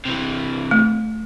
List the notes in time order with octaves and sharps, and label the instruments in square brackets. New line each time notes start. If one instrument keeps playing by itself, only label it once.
[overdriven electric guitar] C3 E3
[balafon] A3